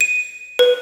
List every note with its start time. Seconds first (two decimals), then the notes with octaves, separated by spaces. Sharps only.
0.01 D#7
0.59 B4